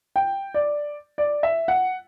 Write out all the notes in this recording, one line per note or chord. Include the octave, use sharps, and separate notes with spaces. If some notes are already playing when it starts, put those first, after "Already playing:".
G5
D5
D5
E5
F#5